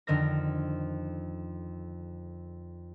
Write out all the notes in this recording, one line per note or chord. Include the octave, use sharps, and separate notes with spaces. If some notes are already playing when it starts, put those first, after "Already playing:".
F2 D3 D#3 A#4 F6 A#6